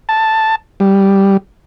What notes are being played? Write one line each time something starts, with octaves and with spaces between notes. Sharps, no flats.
A5
G3